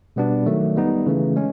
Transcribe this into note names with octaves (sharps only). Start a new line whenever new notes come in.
B2 G3 B3 D4
D#3 F#3 A3
G3 B3 D#4
C#3 E3 A3
G#3 C#4